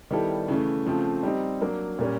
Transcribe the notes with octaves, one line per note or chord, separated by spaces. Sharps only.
D#3 G3 B3 E4 A4
C#3 E3 A3
C#3 F3 A3 C4
G3 C4 D#4
F#3 A#3 D4
A#2 G3 A#3 C#4